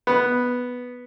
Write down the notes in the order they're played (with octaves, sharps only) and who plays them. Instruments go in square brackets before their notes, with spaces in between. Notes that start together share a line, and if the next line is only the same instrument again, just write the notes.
[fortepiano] B3